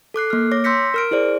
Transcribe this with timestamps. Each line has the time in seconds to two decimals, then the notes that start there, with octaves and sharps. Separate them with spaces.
0.14 A4 D6 F#6 C7
0.30 A#3 F6
0.52 C#5 D6 A#6
0.64 C6 E6 G6 A#6 B6 C#7
0.94 A#4 F6 D7
1.11 E4 G#4 C5 D5